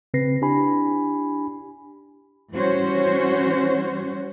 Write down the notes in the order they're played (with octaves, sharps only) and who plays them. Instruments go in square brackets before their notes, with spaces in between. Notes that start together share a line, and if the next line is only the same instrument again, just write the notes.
[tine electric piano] C#3 C4 B4 A#6 C7
D4 E4 G4 G#5 B5
[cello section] E3 G3 C#4 F#4 C5 C#5